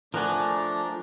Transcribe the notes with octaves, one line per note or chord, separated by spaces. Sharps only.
F3 A3 D4 A#4 F#5 G#5 A#5